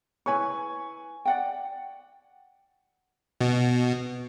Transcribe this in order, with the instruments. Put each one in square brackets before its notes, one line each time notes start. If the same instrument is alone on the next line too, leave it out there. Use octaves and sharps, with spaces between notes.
[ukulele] E4 B4 C#5 [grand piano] G#5 C#6
[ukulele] D5 F#5 G5
[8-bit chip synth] B2